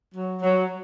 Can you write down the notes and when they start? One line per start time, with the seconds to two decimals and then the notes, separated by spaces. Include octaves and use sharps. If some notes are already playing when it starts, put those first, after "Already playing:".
0.15 F#3
0.42 F#3